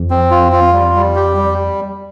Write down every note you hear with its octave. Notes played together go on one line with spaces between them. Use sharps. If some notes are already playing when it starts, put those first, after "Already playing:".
Already playing: F2
C4
F4
F4
G3
G3
G4
G3